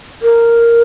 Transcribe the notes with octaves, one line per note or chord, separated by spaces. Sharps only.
A#4